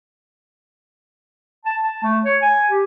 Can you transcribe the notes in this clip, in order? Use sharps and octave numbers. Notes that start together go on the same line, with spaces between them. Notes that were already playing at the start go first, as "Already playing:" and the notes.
A5
A5
A3
C#5
G#5
G4